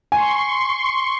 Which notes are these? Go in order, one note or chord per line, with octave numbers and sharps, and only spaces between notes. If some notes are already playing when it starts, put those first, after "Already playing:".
G#5 C6 C#6